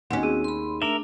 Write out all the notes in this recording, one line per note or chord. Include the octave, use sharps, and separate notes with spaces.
D#2 C4 C#4 F#4 F#5
G#4 E6 D#7
B5 C6
A3 D4 A#4 E5